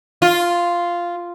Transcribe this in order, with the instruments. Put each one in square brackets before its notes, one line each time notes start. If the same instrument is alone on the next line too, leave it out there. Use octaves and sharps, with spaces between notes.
[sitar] F4